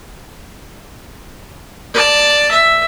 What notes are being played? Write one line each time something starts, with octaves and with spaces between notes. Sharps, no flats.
D5 A5
E5